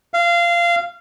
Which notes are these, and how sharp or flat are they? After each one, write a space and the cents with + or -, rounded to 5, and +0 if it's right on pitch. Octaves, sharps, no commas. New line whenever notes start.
F5 -20